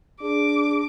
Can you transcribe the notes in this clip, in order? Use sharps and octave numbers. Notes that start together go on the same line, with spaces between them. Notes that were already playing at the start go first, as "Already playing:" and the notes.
D4 G#4 D6